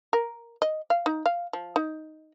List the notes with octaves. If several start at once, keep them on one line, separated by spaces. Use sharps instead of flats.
A#4
D#5
F5
D#4
F5
F3
D#4